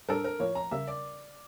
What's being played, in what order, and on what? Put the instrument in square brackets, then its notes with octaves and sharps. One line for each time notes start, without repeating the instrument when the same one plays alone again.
[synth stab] A2 G3 D4 A4 [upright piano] A#4
[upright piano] A#4
[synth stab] A2 F3 A#3 [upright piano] C#5
[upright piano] A#5
[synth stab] C#3 G3 A#3 [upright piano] E5
[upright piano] D5